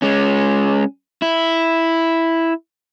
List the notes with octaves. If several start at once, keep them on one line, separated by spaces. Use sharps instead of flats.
G#3 C#4
E4